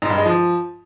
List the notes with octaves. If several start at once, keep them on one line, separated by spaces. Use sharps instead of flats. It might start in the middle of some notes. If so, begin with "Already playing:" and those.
G#2
G2
G#3
F3